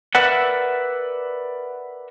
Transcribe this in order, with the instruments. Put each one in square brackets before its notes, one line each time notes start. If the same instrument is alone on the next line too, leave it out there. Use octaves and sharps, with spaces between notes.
[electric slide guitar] A#4 B4 D5 E5 F#5